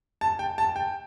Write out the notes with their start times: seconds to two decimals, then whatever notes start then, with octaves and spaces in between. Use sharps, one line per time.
0.21 A5
0.39 G5
0.58 A5
0.76 G5